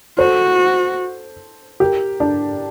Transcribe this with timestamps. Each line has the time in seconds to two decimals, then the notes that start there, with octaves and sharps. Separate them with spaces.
0.18 F#4 A4 C5
1.80 G4 A#4
2.20 D4